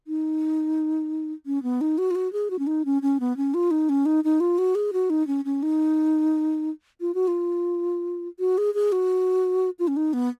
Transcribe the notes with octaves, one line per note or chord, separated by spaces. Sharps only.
D#4
C#4
B3
D#4
F#4
F4
F#4
G#4
F#4
C#4
D#4
C#4
C#4
B3
C#4
F4
D#4
C#4
D#4
D#4
F4
F#4
G#4
F#4
D#4
C#4
C#4
D#4
F4
F#4
F4
F#4
G#4
G#4
F#4
F4
C#4
D#4
B3